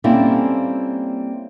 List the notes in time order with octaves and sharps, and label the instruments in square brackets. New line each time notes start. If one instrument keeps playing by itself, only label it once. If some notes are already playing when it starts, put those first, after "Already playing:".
[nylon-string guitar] G3 A#3 C4 C#4 E4 A4